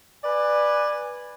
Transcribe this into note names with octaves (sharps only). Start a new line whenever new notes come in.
B4 D5 G#5